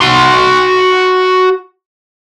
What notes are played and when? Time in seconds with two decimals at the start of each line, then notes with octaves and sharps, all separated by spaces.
0.01 F#4 C6